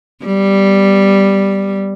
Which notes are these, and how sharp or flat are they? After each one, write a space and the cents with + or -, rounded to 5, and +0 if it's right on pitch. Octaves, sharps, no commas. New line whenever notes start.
G3 +0 B3 +0